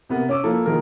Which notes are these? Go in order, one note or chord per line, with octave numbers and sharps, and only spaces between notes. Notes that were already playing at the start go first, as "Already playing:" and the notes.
C3 B3 A#4 F#5
C#4 D6 E6
F3 A#3 E4 A4
D#3 F3 G#3 A#3 A#4